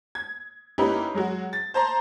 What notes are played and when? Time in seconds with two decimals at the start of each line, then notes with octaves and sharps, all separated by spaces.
0.15 G#6
0.78 A#3 C#4 D#4 E4 G4 B4
1.14 F#3 G#3 F#4
1.53 A6
1.74 C5 A5 A#5 C6